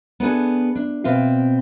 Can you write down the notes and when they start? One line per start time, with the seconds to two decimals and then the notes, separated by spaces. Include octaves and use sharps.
0.20 B3 D4 G#4 A4
0.75 D4
1.04 B2 C4 B4 F5